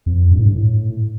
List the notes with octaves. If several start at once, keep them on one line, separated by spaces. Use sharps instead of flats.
F2
G2
A2
G2
A2